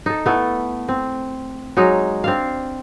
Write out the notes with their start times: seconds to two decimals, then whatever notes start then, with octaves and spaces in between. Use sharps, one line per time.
0.06 D#4 A4
0.26 A3 B3 E4 A4
0.88 C4
1.77 F#3 G#3 D#4
2.24 C4 D4 F5